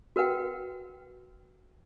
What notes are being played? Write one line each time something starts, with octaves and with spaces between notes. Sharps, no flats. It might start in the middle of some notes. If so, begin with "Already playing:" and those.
F#4 A#4 B4 F#5 G5